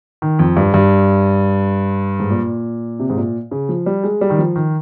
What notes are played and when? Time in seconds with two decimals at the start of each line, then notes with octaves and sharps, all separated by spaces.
0.22 D#3
0.39 F2
0.57 G2
0.74 G2
2.19 G#2
2.30 A#2
2.99 C3
3.10 G#2
3.17 A#2
3.51 C#3
3.69 F3
3.86 G3
4.04 G#3
4.21 G3
4.30 D#3
4.39 F3
4.56 D#3